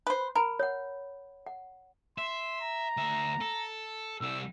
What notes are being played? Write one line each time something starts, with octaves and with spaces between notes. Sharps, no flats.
B4 C5
A#4 B5
C#5 F#5
F#5
E5 C6
A#5
D2 E5
A4
C2 G3 E6